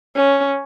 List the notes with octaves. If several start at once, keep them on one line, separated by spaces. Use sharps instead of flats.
C#4